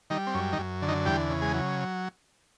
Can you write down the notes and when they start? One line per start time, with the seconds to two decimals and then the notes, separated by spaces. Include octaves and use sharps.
0.10 D#3 G3 D#4
0.27 C4
0.34 F#2 C#4
0.52 D#3 D#4
0.59 F#2
0.82 D3
0.88 D#3 D#4
1.06 E2 G3 G4
1.30 C#3
1.42 G#3 G#4
1.54 F#3